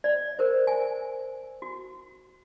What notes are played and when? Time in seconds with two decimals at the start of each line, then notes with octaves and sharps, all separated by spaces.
0.04 D5
0.39 A#4 C5
0.67 G#5
1.62 F#4